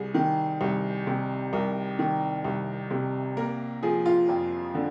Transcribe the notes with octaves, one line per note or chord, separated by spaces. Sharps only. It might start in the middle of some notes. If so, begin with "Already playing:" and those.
Already playing: C2 G#4
D#3
C2
C3
C2 A#4
D#3
C2
C3
A#3 A#4
F3 G#4
F4
F2
D3